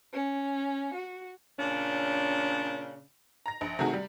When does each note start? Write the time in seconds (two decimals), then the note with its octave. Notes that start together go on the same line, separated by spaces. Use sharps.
0.14 C#4
0.93 F#4
1.58 A#2 C#3 C#4 D4
3.46 A#5 A#6
3.61 A#1
3.79 C3 D#3 A3 F#4 G#4
3.94 G3